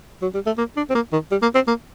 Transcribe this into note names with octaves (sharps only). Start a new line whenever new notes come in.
F#3
G3
A3
A#3
D4
C4
A#3
D#3
G3
A#3
C4
A#3